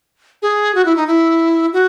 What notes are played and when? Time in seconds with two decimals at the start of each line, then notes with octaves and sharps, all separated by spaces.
0.42 G#4
0.75 F#4
0.85 E4
0.97 D#4
1.07 E4
1.73 F#4